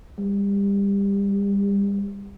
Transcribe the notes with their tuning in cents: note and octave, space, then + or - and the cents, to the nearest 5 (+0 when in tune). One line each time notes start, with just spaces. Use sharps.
G3 +30